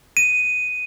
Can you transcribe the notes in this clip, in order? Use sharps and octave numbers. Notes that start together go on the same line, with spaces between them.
D#7